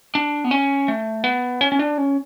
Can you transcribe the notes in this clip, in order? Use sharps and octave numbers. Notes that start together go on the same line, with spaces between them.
D4
B3
C#4
A3
B3
C#4
C#4
D4
C#4